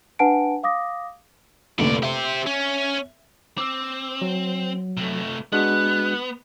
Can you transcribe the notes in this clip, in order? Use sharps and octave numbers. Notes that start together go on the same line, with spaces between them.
D4 B4 F#5 G#5 A5 D7
F5 D6 D#6 A#6
F1 A#1 A2 D3 D5
G4 C5 E5
C#4
C4 D6 E6
F#3
C3 A3
G#3 B3 D4 F#4 F#6